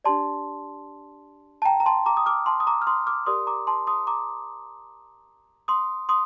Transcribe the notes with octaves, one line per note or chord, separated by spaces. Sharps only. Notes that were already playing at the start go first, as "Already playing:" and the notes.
D4 G4 D5 A5 C6
A5
G5 A#5
A#5
A5 C6
A#5 D6
D#6
D6 F6
A5 C6
D#6
A#5 D6
F6
C6 D#6
D6 F6
G4 A#4 D5 C6 D#6
A#5 D6
A5 C6
C6 D#6
A#5 D6
C6 D#6
C6 D#6